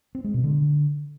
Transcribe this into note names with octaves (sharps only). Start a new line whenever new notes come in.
C4
G#3
B2
D3